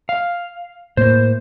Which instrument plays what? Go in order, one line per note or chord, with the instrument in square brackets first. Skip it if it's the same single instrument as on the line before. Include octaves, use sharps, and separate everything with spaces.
[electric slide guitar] F5
[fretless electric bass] A2 A#3 [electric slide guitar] C5